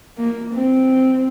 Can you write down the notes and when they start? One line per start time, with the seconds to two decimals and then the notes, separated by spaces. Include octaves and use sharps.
0.18 A#3
0.53 C4